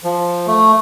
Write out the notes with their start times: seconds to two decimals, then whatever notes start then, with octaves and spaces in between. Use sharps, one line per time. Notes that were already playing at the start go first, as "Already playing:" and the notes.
0.04 F3
0.47 A3